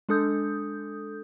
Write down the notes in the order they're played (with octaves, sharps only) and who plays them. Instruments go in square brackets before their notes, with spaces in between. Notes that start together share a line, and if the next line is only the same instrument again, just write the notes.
[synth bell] G#3 D4 A4 D#6 G6